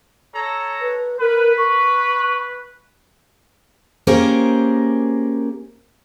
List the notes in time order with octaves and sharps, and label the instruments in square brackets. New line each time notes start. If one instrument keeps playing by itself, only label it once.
[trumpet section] A4 C#5 A#5
[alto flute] B4
[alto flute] A#4 [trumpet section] B4
[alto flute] C#6
[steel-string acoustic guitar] A#3 C#4 G4 G#4 A#4 C5